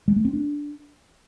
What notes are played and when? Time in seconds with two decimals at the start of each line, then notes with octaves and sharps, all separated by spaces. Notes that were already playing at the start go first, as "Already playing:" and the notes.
0.08 G#3
0.16 A3
0.25 C4
0.33 D4